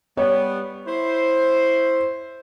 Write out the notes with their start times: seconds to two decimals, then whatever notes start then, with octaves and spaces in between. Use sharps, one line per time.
0.17 G3 B3 C#5
0.87 E4 C5